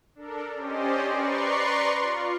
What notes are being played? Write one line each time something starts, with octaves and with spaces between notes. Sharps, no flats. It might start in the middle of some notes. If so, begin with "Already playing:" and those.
D4 A4 A#4
C#4 G4 C5 D5 D#5
B4 D5 A#5 C6 C#6
F4